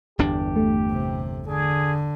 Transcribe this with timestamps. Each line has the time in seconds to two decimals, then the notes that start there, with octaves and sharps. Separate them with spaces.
0.19 G1 E2 D4 G4
0.56 A3
0.91 C3
1.47 D3 G#4